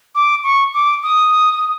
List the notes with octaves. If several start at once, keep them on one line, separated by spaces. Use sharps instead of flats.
D6
C#6
D6
D#6